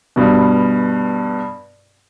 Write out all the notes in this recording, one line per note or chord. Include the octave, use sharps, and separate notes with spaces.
G2 B2